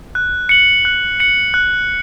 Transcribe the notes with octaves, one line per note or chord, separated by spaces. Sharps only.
F#6
C#7 F#7
F#6
C#7 F#7
F#6